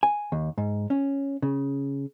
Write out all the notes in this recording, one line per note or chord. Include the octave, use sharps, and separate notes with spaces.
G#5
D#2
G#2
C#4
C#3